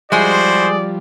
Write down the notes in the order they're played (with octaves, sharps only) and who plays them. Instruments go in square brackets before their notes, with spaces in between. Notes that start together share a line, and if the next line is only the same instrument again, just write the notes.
[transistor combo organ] F3 G3 [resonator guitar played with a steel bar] G#3 G#4 [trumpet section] E4 F#4 C5 [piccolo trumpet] D5